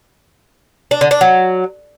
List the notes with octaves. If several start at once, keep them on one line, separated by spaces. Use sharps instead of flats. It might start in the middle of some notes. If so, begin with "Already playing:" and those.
D4
D3
D4
F#3